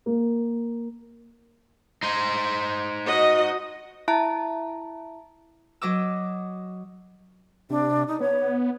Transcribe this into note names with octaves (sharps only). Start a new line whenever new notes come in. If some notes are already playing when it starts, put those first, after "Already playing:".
A#3
D#4 C5
F#4 D#5
E4 E5 A5 A#5
F#3 D#5 D6 E6
C3 D4
D#4
B3 C#5